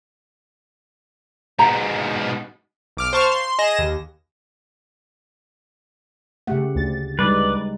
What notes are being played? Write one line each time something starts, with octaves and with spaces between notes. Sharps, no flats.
G#2 B2 F#5 A#5
B1 D6 F6
C5 F5 A5 C#6 F6
C6
G#4 D#5 A#6 E7
D#2
C#3 A3 G4 F#5
D2 A6
G3 G#3 D#4 B4 D5